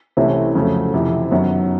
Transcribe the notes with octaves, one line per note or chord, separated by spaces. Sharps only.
C2 C3 E3 A3 C#4
F2 C#3 F#3 A3
F2 C3 E3
F#2 D#3 F#3 B3